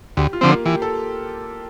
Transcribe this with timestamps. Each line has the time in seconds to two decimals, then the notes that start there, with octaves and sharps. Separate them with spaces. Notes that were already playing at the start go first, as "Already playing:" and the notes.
0.17 D2 G4
0.33 F4
0.41 D3 F3 C4
0.50 A#3
0.65 E3 G4
0.82 A4